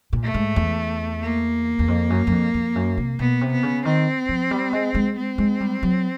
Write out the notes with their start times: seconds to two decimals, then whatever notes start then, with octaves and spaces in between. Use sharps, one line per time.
0.13 A#2
0.24 A3
0.34 G#2
0.56 E2
1.22 A#3
1.79 E2
1.88 F2
2.10 F#2
2.27 F#2
2.32 F2
2.54 F2
2.75 F#2
2.97 C3
3.19 B2 B3
3.41 C3
3.52 B3
3.63 C#3
3.85 D#3 C4
4.29 F3
4.51 G3
4.73 G#3
4.94 G#3
5.17 C4
5.38 G#3
5.60 G3
5.83 F#3